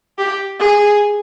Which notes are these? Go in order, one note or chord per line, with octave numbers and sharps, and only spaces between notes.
G4
G#4